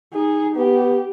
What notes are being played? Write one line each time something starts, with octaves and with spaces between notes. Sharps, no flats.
D#4 G#4
B3 G4